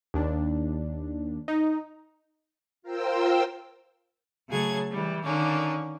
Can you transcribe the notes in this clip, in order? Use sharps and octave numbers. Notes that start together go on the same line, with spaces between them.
D#2 D4
D#4
F4 A#4 C5 G5 E6
C#3 F#3 A3 G#4 A5 G#6
E3 G3
D3 D#3 A#3 C#4